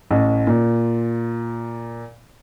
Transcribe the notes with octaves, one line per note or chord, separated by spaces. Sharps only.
A1
A#2